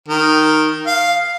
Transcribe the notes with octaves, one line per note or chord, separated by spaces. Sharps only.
D#3
F5